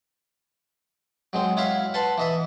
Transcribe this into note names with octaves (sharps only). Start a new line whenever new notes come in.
F#3 G#3 C4
E4 F#4 C#5 E5 F5
B4 F#5 A5 C6
E3 D#5 E5